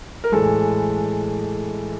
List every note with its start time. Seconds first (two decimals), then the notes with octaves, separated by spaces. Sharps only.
0.24 A#4
0.32 A2 E3 G#3 A4